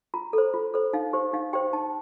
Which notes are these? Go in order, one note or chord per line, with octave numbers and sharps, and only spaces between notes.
F4 A#5
A4 C5
F4
A4 C5
D#4 F5
G4 C5
D#4 F5
G4 C5 G5
D#4 A5